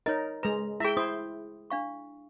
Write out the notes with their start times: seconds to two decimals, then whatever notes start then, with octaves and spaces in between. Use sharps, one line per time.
0.06 D#4 A#4 C#5 D#5
0.43 G#3 B4 A#5
0.80 E4 G#4 E5 G5
0.97 E4 C5 D#6
1.70 D4 F5 C#6